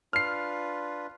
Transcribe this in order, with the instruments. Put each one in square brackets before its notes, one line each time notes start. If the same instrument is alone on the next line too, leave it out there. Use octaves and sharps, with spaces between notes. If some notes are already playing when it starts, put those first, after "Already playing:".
[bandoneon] D4 F4 B4 [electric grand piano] F6 C7